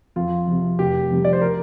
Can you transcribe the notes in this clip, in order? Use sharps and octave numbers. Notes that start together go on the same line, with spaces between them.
F2 F4
C3 F3
F1 G4
F2 C3 G3
D5
C5
A#4